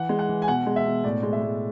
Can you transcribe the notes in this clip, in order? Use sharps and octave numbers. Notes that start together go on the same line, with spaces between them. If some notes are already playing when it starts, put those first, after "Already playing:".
Already playing: E3 F#5
G#3
F#5
E3
G#5
B2 F#5
G#3
E5
B2
A2 D5
G#3
E5
G#3